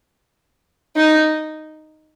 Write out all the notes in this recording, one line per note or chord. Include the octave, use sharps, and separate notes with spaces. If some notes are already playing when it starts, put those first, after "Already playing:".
D#4